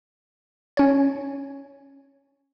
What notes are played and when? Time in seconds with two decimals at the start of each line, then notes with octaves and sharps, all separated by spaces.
0.77 C#4 C#5